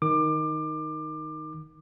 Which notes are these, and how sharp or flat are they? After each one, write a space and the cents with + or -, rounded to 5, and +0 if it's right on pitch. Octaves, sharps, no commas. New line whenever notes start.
D#3 +0 D6 +25